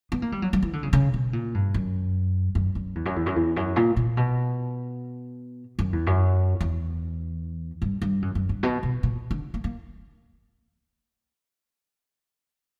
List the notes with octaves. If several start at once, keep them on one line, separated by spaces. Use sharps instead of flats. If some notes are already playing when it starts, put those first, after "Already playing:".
B3
A#3
G3
F#3
F#3
E3
D3
C#3
C#3
B2
A#2
G2
F#2
F#2
F#2
E2
F#2
E2
F#2
E2
F#2
A#2
A#2
B2
F#2
E2
F#2
E2
G2
G2
F#2
F#2
G2
B2
B2
A#2
D3
A#3
A#3